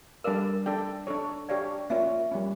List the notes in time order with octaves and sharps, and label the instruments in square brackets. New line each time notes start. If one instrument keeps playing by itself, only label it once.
[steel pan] G3 D4 A4 D5 F5 [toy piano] A#4
[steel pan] D4 A4 D5 G5
D4 A4 C#5
[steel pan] D4 G4 C#5 F5 [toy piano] D5
[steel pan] A#3 C#4 F4 C#5 [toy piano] E5
[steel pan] G3 A#3 C#4